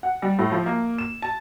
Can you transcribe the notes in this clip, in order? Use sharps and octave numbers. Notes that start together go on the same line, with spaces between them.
F#5
G3
A2
F3
A#3
E7
A5